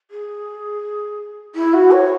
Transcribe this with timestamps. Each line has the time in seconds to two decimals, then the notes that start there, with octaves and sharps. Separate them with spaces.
0.11 G#4
1.55 E4
1.73 F#4
1.91 C#5